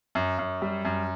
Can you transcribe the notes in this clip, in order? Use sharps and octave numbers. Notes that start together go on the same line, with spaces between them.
F#2
F#2
G3
F#2